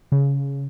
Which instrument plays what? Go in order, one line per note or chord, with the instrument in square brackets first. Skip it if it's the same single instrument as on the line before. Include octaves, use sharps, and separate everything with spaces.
[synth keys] C#3